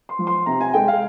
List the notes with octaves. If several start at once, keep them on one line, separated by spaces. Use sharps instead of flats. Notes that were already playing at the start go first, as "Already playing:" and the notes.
C6
F3
C6
C3 A#5
G#5
G#3 G5
F5